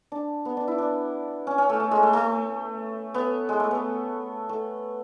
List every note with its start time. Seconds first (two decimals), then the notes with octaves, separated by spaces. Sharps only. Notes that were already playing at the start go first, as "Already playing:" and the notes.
0.12 D4
0.45 B3
0.57 D4
0.68 E4
0.78 D4
1.47 C#4
1.58 C#4
1.69 A3
1.80 A3
1.91 G#3
2.03 A3
2.13 A3
3.14 B3
3.49 G#3
3.60 A3
3.71 B3
4.49 A3